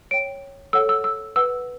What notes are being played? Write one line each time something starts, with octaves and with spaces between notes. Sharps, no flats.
C#5 G5 D7
A4 C#5 F#5 E6
E6
E6
B4 F#5 E6